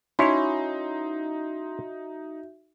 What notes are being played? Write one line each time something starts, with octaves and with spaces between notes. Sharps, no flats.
C#4 D#4 E4 F#4 C#5 E5 C6